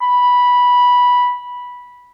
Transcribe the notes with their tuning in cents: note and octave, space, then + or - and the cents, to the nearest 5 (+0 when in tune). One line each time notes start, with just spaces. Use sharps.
B5 -10